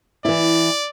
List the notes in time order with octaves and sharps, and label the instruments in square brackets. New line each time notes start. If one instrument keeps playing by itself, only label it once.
[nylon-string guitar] E3 E4 [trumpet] D5